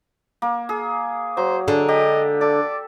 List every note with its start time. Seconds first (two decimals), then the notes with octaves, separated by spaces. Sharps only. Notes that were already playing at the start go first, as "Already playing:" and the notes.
0.42 A#3
0.69 G#4
1.37 F#3 C5
1.68 D3 G#3 D4
1.89 G4 D#5
2.41 A4 D5